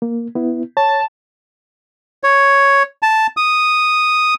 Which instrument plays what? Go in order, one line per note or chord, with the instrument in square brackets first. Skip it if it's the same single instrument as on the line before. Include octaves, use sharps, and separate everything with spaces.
[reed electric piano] A#3
B3 E4
[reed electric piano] C#5 [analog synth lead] A5
[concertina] C#5
A5
D#6